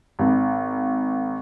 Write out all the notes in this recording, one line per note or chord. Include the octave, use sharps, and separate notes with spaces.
G#1